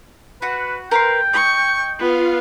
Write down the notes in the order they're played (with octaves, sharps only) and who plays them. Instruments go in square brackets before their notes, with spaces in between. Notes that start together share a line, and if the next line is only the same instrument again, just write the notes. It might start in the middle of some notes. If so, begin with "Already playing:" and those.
[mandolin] F#4 F#5 [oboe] B4
[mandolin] A#4 B4 C6 [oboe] G5
[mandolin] D#5 [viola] C#6
[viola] B3 [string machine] F4 F5